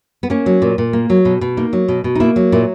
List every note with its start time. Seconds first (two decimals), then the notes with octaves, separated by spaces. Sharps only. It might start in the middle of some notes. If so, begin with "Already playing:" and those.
0.23 B3
0.30 A#3 C#4
0.46 F#3
0.62 A#2
0.78 A#2
0.93 A#3
1.10 F#3
1.25 B2
1.41 B2
1.57 A#3 D#4
1.73 F#3
1.88 B2
2.04 B2
2.15 D#4
2.20 A#3 E4
2.36 F#3
2.52 A#2 E4